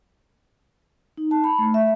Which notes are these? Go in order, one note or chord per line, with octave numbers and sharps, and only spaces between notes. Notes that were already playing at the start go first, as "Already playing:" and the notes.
D#4
A5
B5
A3
E5